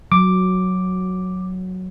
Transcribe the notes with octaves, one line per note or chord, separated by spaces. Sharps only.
F#3 D6